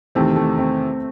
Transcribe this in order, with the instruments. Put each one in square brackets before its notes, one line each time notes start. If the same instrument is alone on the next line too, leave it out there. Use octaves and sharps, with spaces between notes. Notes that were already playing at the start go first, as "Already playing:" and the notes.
[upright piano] E2 C3 D#3 [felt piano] A3 C4
[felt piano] A3
A3 C4